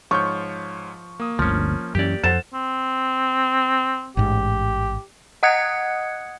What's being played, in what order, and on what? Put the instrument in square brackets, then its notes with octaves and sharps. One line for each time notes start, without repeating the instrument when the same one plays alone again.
[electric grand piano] G#2 C#5 G6 [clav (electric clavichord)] F3 [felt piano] C#6
[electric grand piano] A#3 D#6
[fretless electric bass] G1 D2 [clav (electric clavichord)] F3 C#4
[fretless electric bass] F#2 E3 C#4 [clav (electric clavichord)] G4 D5
[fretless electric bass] F2 [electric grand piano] A4 C5 F#5 [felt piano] A6 E7
[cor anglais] C4
[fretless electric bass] A1 G#2 [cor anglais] G4
[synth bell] D#5 F#5 D#6 F#6 G#6 C#7